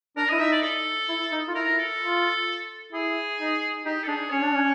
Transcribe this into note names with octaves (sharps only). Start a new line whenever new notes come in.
D4 A#4
E4 D#5
D#4 E5
D5
A4
E4
D#4
F4
E4 A#4
A4
F4
E4 G#4
D#4
D#4 G4
A4
D4 G#4
C#4 C#5
D4
C#4